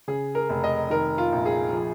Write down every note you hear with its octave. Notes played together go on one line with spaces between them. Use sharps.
C#3 G#4
A#4
F1
D#5
D#3 A#4
F4
A#1
G#4
F3